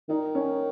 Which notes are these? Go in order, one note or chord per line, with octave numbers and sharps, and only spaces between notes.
D#3 D#4
C#4